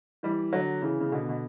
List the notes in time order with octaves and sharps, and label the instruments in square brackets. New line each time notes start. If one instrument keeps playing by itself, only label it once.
[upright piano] E3 G3
D3 F#3
C#3 E3
C#3
B2 D3
B2